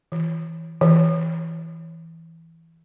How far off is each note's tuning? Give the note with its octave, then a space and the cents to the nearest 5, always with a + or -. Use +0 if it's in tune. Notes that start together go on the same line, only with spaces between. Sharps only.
E3 -10
E3 -5